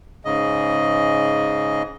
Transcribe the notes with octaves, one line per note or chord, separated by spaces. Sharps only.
G#2 C#3 D#5